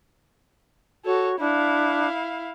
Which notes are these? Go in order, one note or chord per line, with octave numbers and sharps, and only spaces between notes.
F#4 A4 C#5
D4 E4 F5